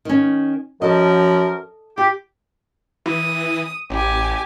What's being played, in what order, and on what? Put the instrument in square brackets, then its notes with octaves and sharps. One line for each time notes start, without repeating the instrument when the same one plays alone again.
[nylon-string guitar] D#3 C#4
[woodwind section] F#2 F3 A#4 [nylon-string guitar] A4 D#5
[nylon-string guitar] F4 [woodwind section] G4
[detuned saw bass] E3 [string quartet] D#6
[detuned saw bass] A1 [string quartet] G4 G#5